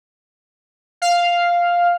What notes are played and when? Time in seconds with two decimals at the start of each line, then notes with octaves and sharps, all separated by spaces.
1.02 F5